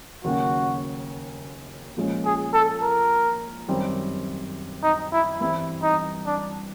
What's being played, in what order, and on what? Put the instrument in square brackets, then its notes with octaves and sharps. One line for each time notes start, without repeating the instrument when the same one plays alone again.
[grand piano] D#2 C#3 F#3 A#3 C#4 [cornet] F#4
[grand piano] A#2 F3 G#3 C#4
[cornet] G#4
A4
A#4
[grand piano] F#2 D#3 G3 C4
[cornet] D#4
E4
[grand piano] G2 E3 G3 C4 [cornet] E4
[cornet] D#4
D4